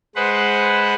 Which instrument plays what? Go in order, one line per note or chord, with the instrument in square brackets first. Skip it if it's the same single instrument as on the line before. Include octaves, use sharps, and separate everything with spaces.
[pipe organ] G#3 B4 C5 F#5